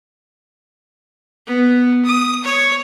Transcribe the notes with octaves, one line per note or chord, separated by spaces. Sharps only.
B3
D#6
C#5